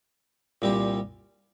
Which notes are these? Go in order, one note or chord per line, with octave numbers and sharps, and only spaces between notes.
C2 A#2 G3 C4 G4